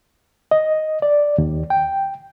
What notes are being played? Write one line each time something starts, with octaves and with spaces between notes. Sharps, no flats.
D#5
D5
D#2
G5